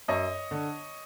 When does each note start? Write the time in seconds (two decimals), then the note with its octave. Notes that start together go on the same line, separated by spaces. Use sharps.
0.08 F#2 C#5 D#5
0.51 D3